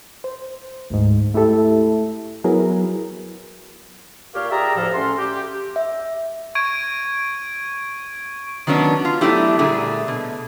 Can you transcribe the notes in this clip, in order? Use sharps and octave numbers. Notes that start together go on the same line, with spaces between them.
C5
D2 G#2
A3 E4 G4 A4 E5
F#3 B3 E4 G#4 A#4 B4
A#2 G4 A#4 C#5 F5
G4 G#4 D5 E5 A#5
D2 A2 F3 A4 F5
A3 C#4 F#5 C6
G4
E5
C#6 G#6 D7 D#7
D#3 F#3 B3 C#4 D4
F4
F#3 A3 B3 D4 E4 G4
A#2 D3 G3 A3 G#4
B2